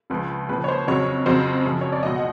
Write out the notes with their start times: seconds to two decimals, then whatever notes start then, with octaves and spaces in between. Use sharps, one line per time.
0.10 C#2 C#3 F3 B4
0.49 D#2 C#3 F3 B4
0.64 C#5
0.68 C5
0.88 F2 C#3 F#3 C#5
1.26 F2 C#3 F#3 C5
1.64 F#2 C#3 F3
1.81 C#5
1.92 D5
2.03 C#2 B2 F#3 D#5
2.16 F#5